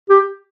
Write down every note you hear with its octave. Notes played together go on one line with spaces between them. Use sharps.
G4